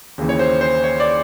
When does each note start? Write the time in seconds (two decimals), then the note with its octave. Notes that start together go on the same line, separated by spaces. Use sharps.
0.18 D#2 C#3 E3
0.29 C#5
0.39 C5
0.61 C5
0.84 C#5
1.00 D5